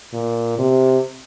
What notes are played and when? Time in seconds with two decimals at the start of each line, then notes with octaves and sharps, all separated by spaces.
0.13 A#2
0.58 C3